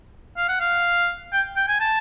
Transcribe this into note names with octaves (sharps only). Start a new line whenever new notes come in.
F5
F#5
F5
G5
G5
G#5
A5